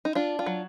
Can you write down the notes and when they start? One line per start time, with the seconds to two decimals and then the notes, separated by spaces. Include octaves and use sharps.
0.05 D#4
0.15 D4 F4
0.39 F4
0.46 F#3